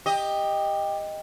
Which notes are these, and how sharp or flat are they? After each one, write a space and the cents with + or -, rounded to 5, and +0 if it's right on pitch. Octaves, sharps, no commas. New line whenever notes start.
G4 +15 D#5 +0